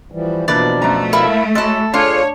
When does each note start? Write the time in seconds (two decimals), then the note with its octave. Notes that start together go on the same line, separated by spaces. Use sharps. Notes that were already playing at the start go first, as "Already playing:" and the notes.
0.12 E3 F3 G3
0.48 B2 E3 F3 A#3 D4 B4 D5
0.82 F#2 A3 A#5
1.13 E4 A#4 F5
1.55 G#3 E4 F#4 A4 C#5
1.94 D4 F4 G#4 A4 C#5